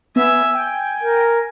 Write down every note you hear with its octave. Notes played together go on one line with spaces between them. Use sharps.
B3 E5 G#5
G5 G#5
A#4